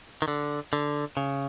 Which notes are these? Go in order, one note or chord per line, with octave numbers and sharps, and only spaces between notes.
D#3
D3
D3
C#3